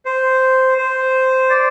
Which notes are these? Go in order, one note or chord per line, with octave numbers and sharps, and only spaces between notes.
C5
C5
D5